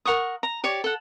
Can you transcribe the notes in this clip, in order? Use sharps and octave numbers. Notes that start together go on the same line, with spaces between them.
A#4 F#5 C#6 D#6
A#5
G4 C#5 D5
A4 F#5